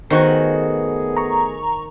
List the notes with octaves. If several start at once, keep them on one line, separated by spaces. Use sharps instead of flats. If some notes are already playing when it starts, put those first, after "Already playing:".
D#3 A3 B3 F#4 G#4 C5 G#5
A#5 C#6